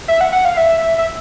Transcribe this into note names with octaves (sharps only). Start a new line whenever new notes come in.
E5
F#5
F#5
F5
E5
E5